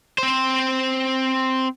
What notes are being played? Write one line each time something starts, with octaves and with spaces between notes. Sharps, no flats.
C4 C5